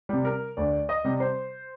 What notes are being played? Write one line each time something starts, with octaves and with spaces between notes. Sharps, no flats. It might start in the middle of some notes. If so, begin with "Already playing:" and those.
C3 G3
A#4
D2 D5
D#5
C3 G3
C5